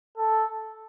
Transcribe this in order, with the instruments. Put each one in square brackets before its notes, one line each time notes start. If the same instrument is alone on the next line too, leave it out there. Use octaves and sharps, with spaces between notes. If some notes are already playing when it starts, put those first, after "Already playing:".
[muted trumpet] A4